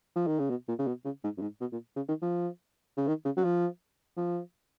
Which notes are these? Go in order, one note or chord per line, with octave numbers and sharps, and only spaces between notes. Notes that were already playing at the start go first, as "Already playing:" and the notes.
F3
D#3
C#3
B2
A#2
C#3
B2
C#3
G#2
F#2
G#2
B2
A#2
C#3
D#3
F3
C#3
D#3
C#3
F#3
F3
F3